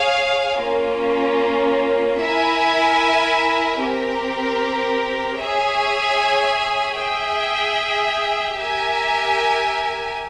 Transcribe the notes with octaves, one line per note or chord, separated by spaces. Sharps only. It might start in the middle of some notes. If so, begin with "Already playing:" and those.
Already playing: G#4 C#5 F5 G#5
A#3 C#4 F4
E4 A#4 E5 G#5
C4 G4 A#4
G#4 C#5 E5 G#5
G#4 E5 G5
G4 A#4 E5 G#5